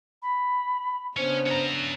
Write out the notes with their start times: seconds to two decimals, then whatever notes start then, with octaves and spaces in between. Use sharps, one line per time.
0.22 B5
1.17 C#3 B3 C#4 D4 C5
1.47 C#4 A#5